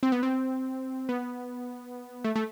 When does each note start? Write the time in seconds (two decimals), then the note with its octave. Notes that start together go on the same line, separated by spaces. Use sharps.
0.03 C4
0.12 B3
0.23 C4
1.09 B3
2.24 A3
2.36 A3